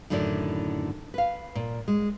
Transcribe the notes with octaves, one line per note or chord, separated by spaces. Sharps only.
F#2 A2 D3 D#3 E4 D5
B4 F5
A#2
G#3